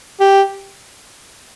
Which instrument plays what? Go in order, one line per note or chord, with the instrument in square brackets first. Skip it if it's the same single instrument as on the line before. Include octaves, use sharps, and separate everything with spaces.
[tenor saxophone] G4